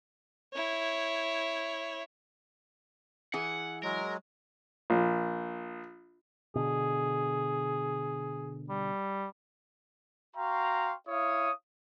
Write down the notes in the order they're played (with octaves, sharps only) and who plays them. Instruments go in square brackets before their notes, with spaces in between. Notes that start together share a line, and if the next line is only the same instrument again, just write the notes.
[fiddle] E4 C#5
[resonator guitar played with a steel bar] E3 G#4 [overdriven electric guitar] F#5
[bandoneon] F#3 G#3 [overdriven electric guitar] A#4
[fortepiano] A#1
[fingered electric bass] B2 D3 [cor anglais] G#4
[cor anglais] G3
[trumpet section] F#4 F5 G5 A#5 C6 C#6
E4 C#5 F5 D#6